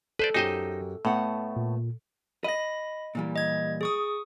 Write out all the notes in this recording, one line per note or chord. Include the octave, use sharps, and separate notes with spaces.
A4 B4 C5 D5
F#2 D#4 G4 C5 D#5 G#5
A2 A3 B3 F#5
A#2
D#5 B5 A#6
A#2 E3 G3
D#5 G#6
G#4 C#6 D#6